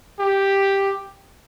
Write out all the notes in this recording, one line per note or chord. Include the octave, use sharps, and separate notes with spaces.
G4